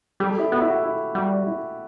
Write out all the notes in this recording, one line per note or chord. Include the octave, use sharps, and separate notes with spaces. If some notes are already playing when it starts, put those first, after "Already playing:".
G3 G4
A4
E4 G4
B3 F#4
E4
F#4
E4
G3 F#4
E4